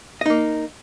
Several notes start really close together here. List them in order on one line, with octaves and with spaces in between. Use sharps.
D#5 D#4 A#3